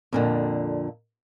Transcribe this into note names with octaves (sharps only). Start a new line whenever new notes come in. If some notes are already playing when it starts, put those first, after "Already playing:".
F2 A#2 D3